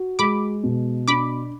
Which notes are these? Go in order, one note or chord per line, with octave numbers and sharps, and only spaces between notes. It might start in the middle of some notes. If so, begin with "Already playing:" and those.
Already playing: F#4
G#3 B5 D6
B2
D4 B5 D6